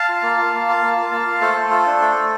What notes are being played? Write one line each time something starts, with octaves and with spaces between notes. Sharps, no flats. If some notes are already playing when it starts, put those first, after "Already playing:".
Already playing: F5 A5
F4
A#3
F4
A#3
F4
A#3
F4
A#3
F4
A3 A4 C5
A3
F4
D4
A3
A3